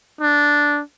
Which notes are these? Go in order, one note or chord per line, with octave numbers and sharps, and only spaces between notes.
D4